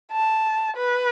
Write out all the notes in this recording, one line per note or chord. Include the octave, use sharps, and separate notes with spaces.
A5
B4